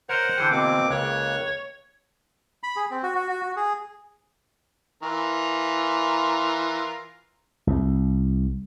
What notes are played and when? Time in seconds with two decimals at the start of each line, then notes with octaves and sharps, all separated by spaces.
0.09 A#4 C5 C#5 D#5 F#5
0.38 D3 E3 G#4 G5
0.51 B2 A#3 C4 D6
0.90 C#2 C#3 A#3 C#5 F#6
2.63 B5
2.76 G#4
2.91 C4
3.03 F#4
3.15 F#4
3.29 F#4
3.43 F#4
3.56 G#4
5.03 E3 F4 A#4
7.67 C2